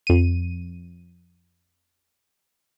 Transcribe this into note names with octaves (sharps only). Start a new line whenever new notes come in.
F2 D#7